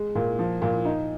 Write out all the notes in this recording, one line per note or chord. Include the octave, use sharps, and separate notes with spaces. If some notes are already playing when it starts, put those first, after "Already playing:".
Already playing: G#3
A#2
F3
A#2
D#4